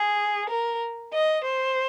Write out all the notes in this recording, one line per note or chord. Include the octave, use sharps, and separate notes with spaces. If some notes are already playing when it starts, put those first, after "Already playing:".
Already playing: G#4
A#4
D#5
C5